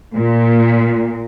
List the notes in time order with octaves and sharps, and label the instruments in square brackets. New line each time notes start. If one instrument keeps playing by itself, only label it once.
[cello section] A#2